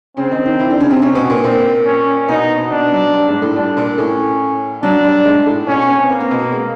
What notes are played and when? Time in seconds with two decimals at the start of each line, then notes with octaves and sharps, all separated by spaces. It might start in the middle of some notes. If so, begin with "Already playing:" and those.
0.17 C#3 C4 C#4
0.31 D#3 D#4
0.46 D#3 D#4
0.59 E3 E4
0.70 D3 D4
0.80 C#3 C#4
0.90 C3 C4
1.01 C3 C4 C#4
1.15 B2 B3
1.29 A#2 A#3
1.43 A#2 A#3 C4
1.86 C#4
2.28 B2 B3 D#4
2.56 B2 B3
2.70 B2 B3 D4
2.92 F#3
3.13 G3
3.27 G#2 G#3
3.42 A2 A3
3.55 G3 D4
3.77 A#2 A#3
3.98 A2 A3 C#4
4.83 F#3 D4
5.04 G3
5.25 G#2 G#3
5.46 A2 A3
5.67 B2 B3 C#4
5.89 B3
5.99 C4
6.09 A#3 B3
6.20 C4
6.31 B2 B3
6.51 G#3